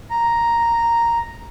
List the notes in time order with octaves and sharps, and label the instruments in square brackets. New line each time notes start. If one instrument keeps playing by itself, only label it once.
[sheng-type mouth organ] A#5